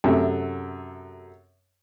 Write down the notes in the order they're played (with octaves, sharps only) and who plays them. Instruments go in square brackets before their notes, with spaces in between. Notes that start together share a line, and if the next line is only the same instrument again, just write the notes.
[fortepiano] F#2 C3 A3 E5